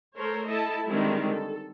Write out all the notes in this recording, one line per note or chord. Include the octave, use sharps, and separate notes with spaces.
A3 A4 A#4 C5 C#5
E4 A4 D#5 A5
D3 D#3 G3 G#3 C4 E4
A4